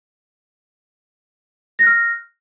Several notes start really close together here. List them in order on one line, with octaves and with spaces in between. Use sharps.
A#6 F#6 F6